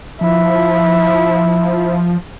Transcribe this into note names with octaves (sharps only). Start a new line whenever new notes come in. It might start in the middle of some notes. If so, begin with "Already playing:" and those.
F3 E4